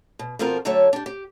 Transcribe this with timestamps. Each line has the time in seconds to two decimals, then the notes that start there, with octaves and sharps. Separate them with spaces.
0.19 B2
0.39 B2 F3 C4 F4 A4 A#4
0.65 D3 F#3 A3 A4 C#5 E5
0.93 D4 G4
1.06 G4